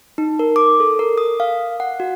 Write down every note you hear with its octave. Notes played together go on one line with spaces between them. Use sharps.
D#4
A#4
D6
A4
A#4
D#6
F5
F#5
F#4